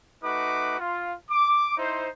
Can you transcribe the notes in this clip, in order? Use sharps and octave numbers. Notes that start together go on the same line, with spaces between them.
A3 D#4 F#4 B4 D6
F4
D6
D#4 E4 C5